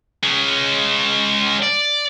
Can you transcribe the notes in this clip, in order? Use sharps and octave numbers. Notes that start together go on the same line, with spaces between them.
G#3 C#4
D5